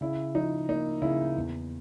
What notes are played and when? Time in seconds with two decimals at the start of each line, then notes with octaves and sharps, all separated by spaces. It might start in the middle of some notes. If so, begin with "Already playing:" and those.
0.01 C#3 E4
0.35 F3 D#4
0.69 A#3 D#4
1.02 C#3 E4
1.36 E2